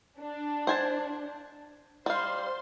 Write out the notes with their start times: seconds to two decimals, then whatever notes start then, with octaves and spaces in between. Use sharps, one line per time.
0.19 D4
0.67 C5 G#5 A5
2.06 G3 C5 F5 C6